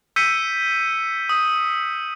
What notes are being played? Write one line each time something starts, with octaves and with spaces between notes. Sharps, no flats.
E6 G6 B6 C#7 D#7
D#6